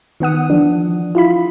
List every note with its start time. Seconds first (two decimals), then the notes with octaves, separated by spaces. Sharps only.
0.20 D#3 B3 F#5 D#6
0.50 E3 F3 D4
1.15 E4 F4 B5